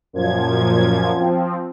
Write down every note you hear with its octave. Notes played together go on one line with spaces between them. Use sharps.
F#2 A#2 F3 G#6
F3 C4